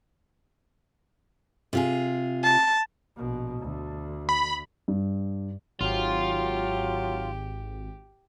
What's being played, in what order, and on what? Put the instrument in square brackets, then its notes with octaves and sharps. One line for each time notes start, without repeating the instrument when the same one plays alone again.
[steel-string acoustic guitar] C3 F4 G#4
[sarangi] A5
[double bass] A#1 B2
D2
[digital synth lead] B5
[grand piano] G2
[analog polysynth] G#1 [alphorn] F#3 [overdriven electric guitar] F4 [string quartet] G4